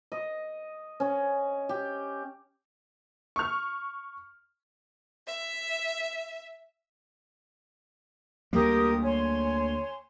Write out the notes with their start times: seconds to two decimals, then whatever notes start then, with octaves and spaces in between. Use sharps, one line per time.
0.12 D#5
1.00 C#4
1.69 G4
3.36 C#6 F6
5.27 E5
8.53 D2 G3 A#3 G4 A#4 D#6
9.02 C#5 G#5 C6